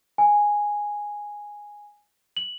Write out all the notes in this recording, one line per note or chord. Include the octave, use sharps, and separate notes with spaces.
G#5
F#7